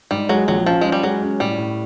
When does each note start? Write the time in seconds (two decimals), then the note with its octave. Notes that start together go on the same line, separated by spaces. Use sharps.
0.11 G#2 G3
0.29 F#3 G#3
0.48 A#1 F#3
0.66 F3 C#4
0.81 G#3 C#4
0.92 G3
1.03 F#3 G#3
1.22 C#4
1.40 A2 G3
1.58 A2